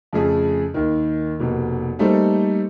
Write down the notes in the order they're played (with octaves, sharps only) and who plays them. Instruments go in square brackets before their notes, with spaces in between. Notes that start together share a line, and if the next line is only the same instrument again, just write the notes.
[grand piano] F2 C#3 A3 G#4
D#2 D#3
F1 B2 A#3
G3 A3 A#3 D#4 A4 C5